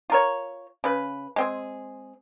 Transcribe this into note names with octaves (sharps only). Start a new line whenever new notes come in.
F4 A#4 C#5
C#3 B4
G#3 C4 G#4